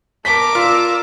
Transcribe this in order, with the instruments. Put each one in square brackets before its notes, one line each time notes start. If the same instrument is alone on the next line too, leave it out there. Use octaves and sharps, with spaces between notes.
[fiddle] A#4 D6 [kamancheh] A5 [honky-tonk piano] B6
[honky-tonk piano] F4 [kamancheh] D5 E6